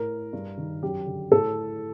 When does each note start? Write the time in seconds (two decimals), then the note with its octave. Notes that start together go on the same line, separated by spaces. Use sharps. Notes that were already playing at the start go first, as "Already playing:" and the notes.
Already playing: A2 A#4
0.33 G2
0.58 D#3
0.83 F#2 G4
1.06 D3
1.32 A2 A4